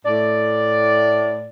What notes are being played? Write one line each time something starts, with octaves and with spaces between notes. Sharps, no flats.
A2 D5